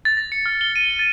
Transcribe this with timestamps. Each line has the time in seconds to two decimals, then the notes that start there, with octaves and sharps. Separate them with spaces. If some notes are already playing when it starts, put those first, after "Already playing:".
0.05 A6
0.17 A#6
0.32 C#7
0.46 F6
0.61 G7
0.76 D#7
0.99 A6